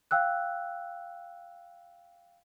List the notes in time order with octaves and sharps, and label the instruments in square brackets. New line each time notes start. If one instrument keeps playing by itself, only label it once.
[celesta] F5 G5 E6 F#6